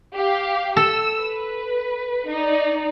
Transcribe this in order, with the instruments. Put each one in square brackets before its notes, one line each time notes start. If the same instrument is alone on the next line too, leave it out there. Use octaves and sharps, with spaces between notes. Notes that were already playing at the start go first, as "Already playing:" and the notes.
[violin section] G4 F5
[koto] A4 [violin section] E6
[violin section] B4
D#4 D5